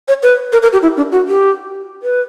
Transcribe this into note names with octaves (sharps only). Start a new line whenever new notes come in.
C#5
B4
A#4
A#4
G4
E4
D4
F#4
G4
B4